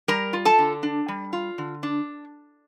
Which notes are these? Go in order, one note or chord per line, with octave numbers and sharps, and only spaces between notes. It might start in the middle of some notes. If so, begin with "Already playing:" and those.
G3 A#4 A#5
F4
A4 A5
D3
D4
G3
F4
D3
D4